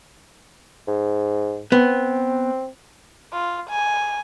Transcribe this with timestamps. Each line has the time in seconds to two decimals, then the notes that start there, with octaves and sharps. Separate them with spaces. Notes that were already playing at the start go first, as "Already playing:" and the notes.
0.88 G#2
1.72 B3 C4
3.33 F4
3.69 G#5